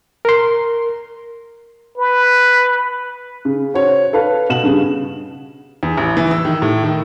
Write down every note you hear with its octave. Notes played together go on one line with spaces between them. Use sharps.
A#4 C6
B4
C#3
F#4 C5 C#5
A4 B4 F5
B2 E7 F#7
G2 C#3
E2
A1
E3
E6
D#3
A2
D#3